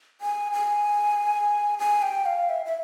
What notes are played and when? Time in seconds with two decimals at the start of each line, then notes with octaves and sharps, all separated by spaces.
0.21 G#5
0.53 G#5
1.79 G#5
2.02 G5
2.26 F5
2.49 E5
2.65 E5